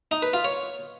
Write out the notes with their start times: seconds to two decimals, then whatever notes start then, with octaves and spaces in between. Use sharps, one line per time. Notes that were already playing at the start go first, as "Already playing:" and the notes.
0.11 D#4
0.22 B4
0.33 F4
0.44 C#5